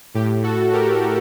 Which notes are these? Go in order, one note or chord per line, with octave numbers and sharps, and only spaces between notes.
A2 G4
F#4 A4
G4 A#4